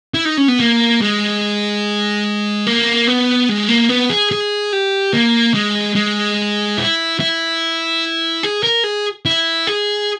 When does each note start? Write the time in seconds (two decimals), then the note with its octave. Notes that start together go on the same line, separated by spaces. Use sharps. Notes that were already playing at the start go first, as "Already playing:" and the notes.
0.14 E4
0.25 D#4
0.38 C#4
0.48 B3
0.60 A#3
1.02 G#3
2.67 A#3
3.07 B3
3.49 G#3
3.69 A#3
3.89 B3
4.10 G#4
4.31 G#4
4.73 G4
5.13 A#3
5.54 G#3
5.95 G#3
6.78 E4
7.20 E4
8.43 G#4
8.63 A#4
8.84 G#4
9.26 E4
9.67 G#4